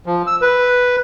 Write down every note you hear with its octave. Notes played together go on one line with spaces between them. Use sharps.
F3
E6
B4